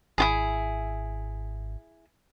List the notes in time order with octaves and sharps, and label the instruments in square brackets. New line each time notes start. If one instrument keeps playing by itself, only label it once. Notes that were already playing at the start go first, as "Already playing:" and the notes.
[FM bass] G#1 [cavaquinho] E4 F4 G#4